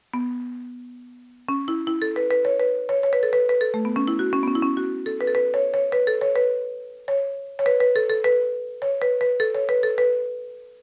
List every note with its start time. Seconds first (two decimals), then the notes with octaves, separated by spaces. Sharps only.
0.14 B3
1.49 C#4
1.68 E4
1.87 E4
2.02 A4
2.16 B4
2.31 B4
2.45 C#5
2.60 B4
2.89 C#5
3.03 C#5
3.13 B4
3.23 A4
3.33 B4
3.49 B4
3.61 A4
3.74 A3
3.85 B3
3.96 C#4
4.08 E4
4.19 F#4
4.33 C#4
4.43 B3
4.47 C#4
4.55 E4
4.62 C#4
4.77 F#4
5.06 A4
5.21 B4
5.27 A4
5.35 B4
5.54 C#5
5.74 C#5
5.92 B4
6.07 A4
6.21 C#5
6.36 B4
7.08 C#5
7.59 C#5
7.66 B4
7.80 B4
7.96 A4
8.10 A4
8.24 B4
8.82 C#5
9.02 B4
9.21 B4
9.40 A4
9.55 C#5
9.69 B4
9.83 A4
9.98 B4